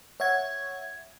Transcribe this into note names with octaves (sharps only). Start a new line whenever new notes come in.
C#5 E5 F#5 G#6